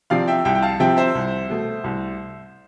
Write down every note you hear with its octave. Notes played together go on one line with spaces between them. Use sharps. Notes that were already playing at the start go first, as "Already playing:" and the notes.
C3 F3 C4 D5 F5
E5 G5
C2 E5 G5
G5
F5 A5
C3 F3 C4 E5 G5
C5 E5
C2
B2 A3
C2